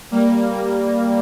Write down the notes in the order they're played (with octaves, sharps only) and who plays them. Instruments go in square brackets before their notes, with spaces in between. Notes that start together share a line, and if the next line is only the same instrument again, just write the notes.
[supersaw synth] G3 A#3